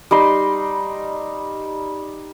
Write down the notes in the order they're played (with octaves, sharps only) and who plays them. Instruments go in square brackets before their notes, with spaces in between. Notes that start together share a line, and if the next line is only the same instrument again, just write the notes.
[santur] G3 D#4 C6